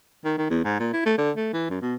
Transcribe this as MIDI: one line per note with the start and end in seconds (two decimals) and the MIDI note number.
0.25 0.36 51
0.38 0.50 51
0.50 0.60 40
0.64 0.76 44
0.80 0.89 46
0.94 1.05 64
1.06 1.13 57
1.18 1.31 50
1.37 1.49 57
1.53 1.69 52
1.70 1.78 42
1.82 1.95 47